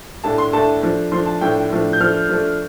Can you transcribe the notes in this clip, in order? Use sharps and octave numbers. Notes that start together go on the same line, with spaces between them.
A2 A3 D4 A5
C6
A2 A3 D4 A5
F3 A3 D4
F3 A3 D4 C6
A5
A2 F3 A3 D4 G5
A2 F3 A3 D4
G6
F3 A3 D4 F6
F3 A3 D4